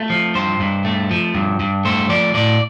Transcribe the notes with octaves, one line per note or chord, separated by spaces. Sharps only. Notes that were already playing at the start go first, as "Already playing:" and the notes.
Already playing: A3 F4
F3
G2 C5
G2
A3
F3
G2
G2
A3 C5
F3 D5
A2 D5